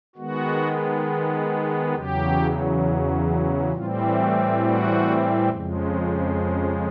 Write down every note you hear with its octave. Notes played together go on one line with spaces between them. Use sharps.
D#3 G#3 B3 F#4
E2 C#3 F#3 G4
A2 E3 G3 C4 F4
F#4
F#4
F2 C#3 F3 G#3